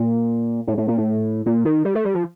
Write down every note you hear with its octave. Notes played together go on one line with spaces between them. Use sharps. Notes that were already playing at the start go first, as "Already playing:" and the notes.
Already playing: A#2
A2
A2
A#2
A2
A#2
D#3
G3
A3
G3
F3